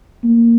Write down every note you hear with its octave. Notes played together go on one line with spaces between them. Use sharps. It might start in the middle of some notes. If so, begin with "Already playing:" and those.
A#3